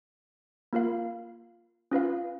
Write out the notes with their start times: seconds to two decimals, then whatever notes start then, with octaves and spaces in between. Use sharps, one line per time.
0.73 A#3 F4 A#4 F5
1.91 C#4 F4 B4 F5